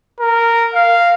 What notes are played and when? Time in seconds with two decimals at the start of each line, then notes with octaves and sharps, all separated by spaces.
0.20 A#4
0.74 F5